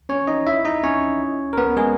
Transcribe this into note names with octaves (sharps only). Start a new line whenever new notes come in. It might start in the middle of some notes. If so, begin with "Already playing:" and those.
C#4 C#5
D#4 D#5
E4 E5
D#4 D#5
C#4 C#5
A#4
B3 B4
G#3 G#4